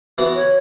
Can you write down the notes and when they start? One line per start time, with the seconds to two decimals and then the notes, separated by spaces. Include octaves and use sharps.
0.18 E3 B3 F#4
0.35 C#5